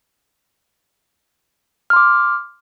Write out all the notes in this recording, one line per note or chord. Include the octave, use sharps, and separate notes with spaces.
C6 D6 F6